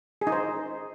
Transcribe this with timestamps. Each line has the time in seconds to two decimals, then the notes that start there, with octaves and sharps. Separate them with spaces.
0.21 G#4
0.27 D#4
0.32 C5